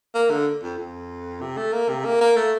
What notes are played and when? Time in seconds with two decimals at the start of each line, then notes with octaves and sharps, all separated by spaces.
0.15 A#3
0.30 D3
0.63 F2
0.78 F2
1.41 C3
1.57 A3
1.73 A#3
1.89 C3
2.05 A#3
2.21 A#3
2.36 A3